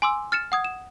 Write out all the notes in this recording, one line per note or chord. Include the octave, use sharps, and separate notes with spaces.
G#5 C6 D6 E6
F6 A6 C#7 E7
F#5 D#6 G#6
E7